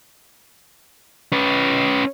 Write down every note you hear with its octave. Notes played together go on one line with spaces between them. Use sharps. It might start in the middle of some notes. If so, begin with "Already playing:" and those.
C#4 B4